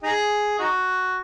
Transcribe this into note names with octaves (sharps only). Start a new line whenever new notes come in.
D#4 G#4
D#4 F#4